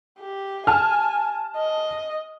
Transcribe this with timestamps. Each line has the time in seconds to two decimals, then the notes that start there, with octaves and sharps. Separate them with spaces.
0.19 G4
0.67 G#5 A5 F6
1.57 D#5